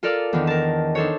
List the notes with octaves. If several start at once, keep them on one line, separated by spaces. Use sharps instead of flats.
F4 A4 A#4 D5 F5
E2 D#3 D4
A#4 A5
D4 D#4 A4 C5 C#5